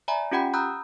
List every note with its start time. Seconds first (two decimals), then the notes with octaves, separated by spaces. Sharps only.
0.08 D5 E5 G#5 A#5 B5
0.31 C#4 F4 G4 F#5 G5 B5
0.54 A#5 B5 D#6 E6 F#6 G6